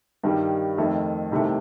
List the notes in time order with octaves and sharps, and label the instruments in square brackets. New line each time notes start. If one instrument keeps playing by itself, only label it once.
[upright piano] G2 D#3 G3
F2 D#3 A3
C2 C3 D#3 A3